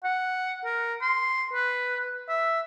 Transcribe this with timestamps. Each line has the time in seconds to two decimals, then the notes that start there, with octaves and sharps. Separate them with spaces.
0.04 F#5
0.65 A#4
1.01 C6
1.53 B4
2.29 E5